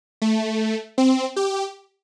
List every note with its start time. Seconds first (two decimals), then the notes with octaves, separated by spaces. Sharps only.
0.22 A3
0.98 C4
1.36 G4